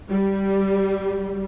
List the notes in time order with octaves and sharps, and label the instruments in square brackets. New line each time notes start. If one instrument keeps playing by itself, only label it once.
[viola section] G3